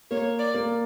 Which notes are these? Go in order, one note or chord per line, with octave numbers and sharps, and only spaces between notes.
A#3 C#5
D5
A#3